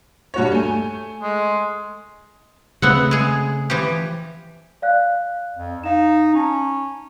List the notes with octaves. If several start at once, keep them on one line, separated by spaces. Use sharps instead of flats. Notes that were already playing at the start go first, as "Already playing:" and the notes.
G2 F#4 C#5
A3 G#5
G#3
C#3 A3 B3 C4 F#5
G#3 G#4
E3 F3 G4
D5 F5 F#6
F2
D#4 F5 E7
C#4 A5 A#5